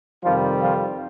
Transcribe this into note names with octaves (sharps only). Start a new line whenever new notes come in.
F2 C3 D#3 F3 G3 C4 F4
F3 F4